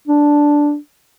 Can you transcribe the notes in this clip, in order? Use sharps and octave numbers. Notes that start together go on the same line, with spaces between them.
D4